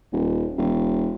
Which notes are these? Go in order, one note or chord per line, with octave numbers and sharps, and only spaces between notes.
D#1
E1